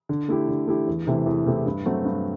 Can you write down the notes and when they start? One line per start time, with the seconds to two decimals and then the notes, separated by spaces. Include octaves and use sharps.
0.09 D3
0.29 A3 E4 G4
0.49 D3
0.67 A3 E4 G4
0.88 E2
1.07 C3 E3 A3 E4
1.26 E2
1.46 C3 E3 A3 E4
1.66 G2
1.85 F#3 A3 C4 F#4
2.05 G2